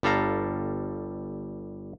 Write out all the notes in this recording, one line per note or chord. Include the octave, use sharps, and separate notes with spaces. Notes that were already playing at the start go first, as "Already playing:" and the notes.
G1 G3 A4 F5 A#5